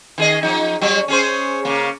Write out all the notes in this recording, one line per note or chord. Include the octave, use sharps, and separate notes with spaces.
D#3 G#4 D#5
F3 D#4
F#3 G3
C#4 G#4 C5
C#3 A#3